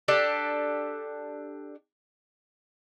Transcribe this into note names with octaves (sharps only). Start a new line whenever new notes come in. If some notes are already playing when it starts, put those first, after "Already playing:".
D4 G4 A4